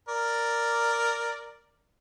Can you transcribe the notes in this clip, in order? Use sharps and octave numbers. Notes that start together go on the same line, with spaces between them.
A#4 D5